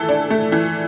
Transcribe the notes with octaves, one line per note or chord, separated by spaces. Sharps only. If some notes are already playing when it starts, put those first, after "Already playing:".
Already playing: E3 A3 A4
D4
A3
E3